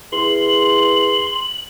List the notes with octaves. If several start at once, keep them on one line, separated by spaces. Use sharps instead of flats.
E2 C6 F#7